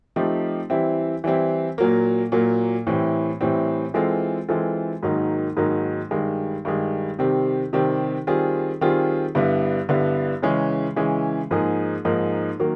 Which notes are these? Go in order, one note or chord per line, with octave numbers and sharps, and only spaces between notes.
F3 A3 C4 D#4 G4
E3 G3 C4 E4
E3 G3 C4 E4
A#2 F#3 A#3
A#2 F#3 A#3
A2 E3 G3 C4
A2 E3 G3 C4
E3 G#3 C4 F4 A4
E3 G#3 C4 F4 A4
G#2 D#3 F#3 A#3 D#4
G#2 D#3 F#3 A#3 D#4
G2 D#3 G#3
G2 D#3 G#3
C3 D#3 G3 C4
C3 D#3 G3 C4
D#3 G3 C4 F4 G#4
D#3 G3 C4 F4 G#4
G2 D3 G3 B3 E4
G2 D3 G3 B3 E4
C#3 E3 G#3 C#4
C#3 E3 G#3 C#4
G#2 F3 A#3 D#4 G#4
G#2 F3 A#3 D#4 G#4
D#3 F#3 A#3